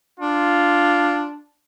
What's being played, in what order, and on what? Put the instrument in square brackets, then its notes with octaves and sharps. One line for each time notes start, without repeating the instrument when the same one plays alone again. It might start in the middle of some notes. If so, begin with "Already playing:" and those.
[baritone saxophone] D4 [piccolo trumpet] F4